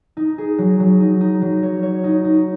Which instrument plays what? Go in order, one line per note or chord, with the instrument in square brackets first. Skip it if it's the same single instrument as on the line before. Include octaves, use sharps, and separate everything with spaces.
[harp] D#4
G#4
F#3
F#3
D#4
D#4
F#3
C#5
C#5
D#4
D#4